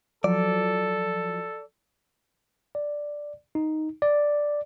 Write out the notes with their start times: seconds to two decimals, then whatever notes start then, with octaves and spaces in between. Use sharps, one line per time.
0.24 F3 F#3 A4 D5
2.75 D5
3.55 D#4
4.02 D5